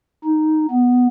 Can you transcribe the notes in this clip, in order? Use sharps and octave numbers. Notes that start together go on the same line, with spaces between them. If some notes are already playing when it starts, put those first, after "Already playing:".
D#4
B3